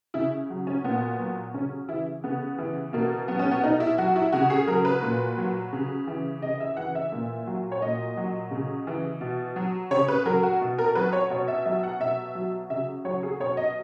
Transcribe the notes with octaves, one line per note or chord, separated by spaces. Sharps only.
C#3 E4
F#3
C#4
A#2 B3
F#3
C#3 C#4
E3 E4
C#3 B3
E3
B2 A#3
F#3 B3
C#4
B3
B2 D#4
E4
F#3 F#4
E4
C#3 F#4
G#4
F#3 A#4
B4
A#2
F#3
C#3
E3
C#3 D#5
E5
E3 F#5
E5
A#2
F#3
C#5
A#2 D#5
F#3
C#3
E3
B2
F#3
C#3 C#5
B4
F#3 A#4
F#4
B2
A#4
F#3 B4
C#5
B2 C#5
E5
F#3 E5
F#5
B2 E5
F#3
C#3 E5
F#3 C#5
G#4
B2 C#5
D#5